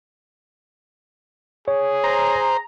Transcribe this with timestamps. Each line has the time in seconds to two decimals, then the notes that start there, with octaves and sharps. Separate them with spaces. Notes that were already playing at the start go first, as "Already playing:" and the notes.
1.68 G#4 C#5
2.04 C5 A#5